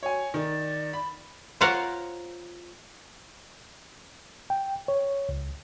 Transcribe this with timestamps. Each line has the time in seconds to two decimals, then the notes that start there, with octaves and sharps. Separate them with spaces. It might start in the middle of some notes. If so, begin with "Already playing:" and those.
0.03 F#4 C#5 G#5
0.34 D#3 D5
0.93 B5
1.61 F4 A#4 C5 C#5 F5 F#5
4.50 G5
4.88 C#5
5.29 C#2